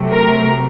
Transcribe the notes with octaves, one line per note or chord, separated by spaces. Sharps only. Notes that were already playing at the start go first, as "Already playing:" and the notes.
Already playing: C3 F#3 A3
A#4